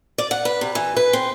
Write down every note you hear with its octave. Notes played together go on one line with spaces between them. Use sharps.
D5
F#5
B4
C3
E3
B4
C4